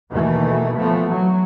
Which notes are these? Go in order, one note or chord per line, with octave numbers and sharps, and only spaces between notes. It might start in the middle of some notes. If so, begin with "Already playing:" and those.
D#2 B2 D#3 E3 A3
E3 F3 A3 B3
F#3